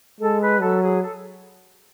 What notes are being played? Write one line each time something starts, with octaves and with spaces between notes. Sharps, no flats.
G#3 A4
B4
F#3 A4
G#4
A4